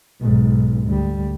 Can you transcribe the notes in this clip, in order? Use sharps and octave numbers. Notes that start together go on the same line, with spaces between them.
B1 G#2
D2 G3